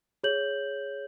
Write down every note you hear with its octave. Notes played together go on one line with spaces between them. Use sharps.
G#4 C#5 G6 F#7